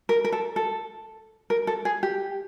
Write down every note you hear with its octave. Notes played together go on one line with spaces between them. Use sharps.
A#4
A#4
A4
A4
A#4
A4
G#4
G4